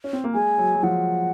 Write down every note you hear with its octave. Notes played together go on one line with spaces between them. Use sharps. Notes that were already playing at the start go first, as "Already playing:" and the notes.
C#4
C4
A#3
G#3 G#5
F#3
F#3
F3 F#5